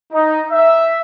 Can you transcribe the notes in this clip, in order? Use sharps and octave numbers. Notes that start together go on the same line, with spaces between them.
D#4
E5